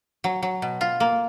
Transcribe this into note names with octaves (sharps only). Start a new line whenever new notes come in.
F#3
F#3
B2
F4
A#3